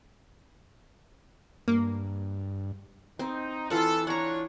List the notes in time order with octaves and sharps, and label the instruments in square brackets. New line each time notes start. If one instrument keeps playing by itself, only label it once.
[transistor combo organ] G2 [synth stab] A#3
[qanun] C4 [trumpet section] D#4
[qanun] E3 F4 F#5 [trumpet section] A4
[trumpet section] D4 F4 C#5 [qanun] F#5 A#5